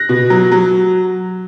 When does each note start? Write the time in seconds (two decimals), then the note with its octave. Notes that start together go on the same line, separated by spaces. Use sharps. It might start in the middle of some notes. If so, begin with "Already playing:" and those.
Already playing: F#6 A#6
0.09 B2
0.30 F#3
0.52 F#3